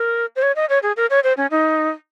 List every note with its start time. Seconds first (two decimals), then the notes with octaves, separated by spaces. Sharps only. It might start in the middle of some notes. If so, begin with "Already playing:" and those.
Already playing: A#4
0.36 C5
0.42 C#5
0.56 D#5
0.69 C#5
0.83 G#4
0.97 A#4
1.10 C#5
1.24 C5
1.37 C#4
1.51 D#4